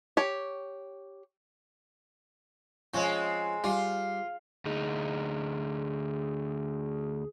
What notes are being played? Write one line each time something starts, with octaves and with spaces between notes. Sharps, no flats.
G4 C#5
F3 G#3 C4 C#4
G3 F4
D2 D#4 G#4